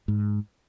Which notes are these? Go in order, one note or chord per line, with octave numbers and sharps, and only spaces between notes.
G#2